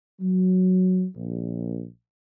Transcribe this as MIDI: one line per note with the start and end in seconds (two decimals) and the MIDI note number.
0.21 1.04 54
1.15 1.86 34